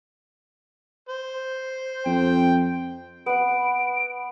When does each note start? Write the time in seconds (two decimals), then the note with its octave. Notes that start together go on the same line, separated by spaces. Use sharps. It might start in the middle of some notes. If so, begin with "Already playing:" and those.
1.09 C5
2.06 F2 G5
3.26 B3 F#5 D7